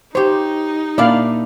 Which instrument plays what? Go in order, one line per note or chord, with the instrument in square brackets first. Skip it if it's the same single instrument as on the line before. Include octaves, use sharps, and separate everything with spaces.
[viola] D#4 [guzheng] G4 C#5 [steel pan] C5
[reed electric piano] A#2 A#3 [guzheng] D4 E4 [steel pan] D5 F5